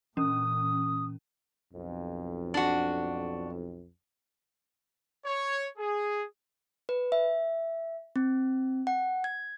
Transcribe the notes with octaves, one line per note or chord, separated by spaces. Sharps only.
A#2 E3 C#4 D#6
B1 F2
D4 F#4
C#5
G#4
B4
E5
C4
F#5
G#6